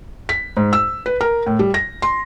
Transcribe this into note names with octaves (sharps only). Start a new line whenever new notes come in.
B6
G#2
E6
B4
A#4
A2
G3
A#6
C6